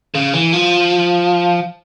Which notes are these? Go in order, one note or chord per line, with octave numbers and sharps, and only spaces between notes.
C#3
E3
F3